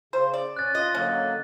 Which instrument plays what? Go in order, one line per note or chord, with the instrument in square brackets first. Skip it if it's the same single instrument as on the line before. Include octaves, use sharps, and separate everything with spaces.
[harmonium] C#3 [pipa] C5
[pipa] D5
[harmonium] C#4 [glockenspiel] F#6 A6
[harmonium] F4 [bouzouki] D#5
[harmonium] D3 F#3 A#3 [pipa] C#4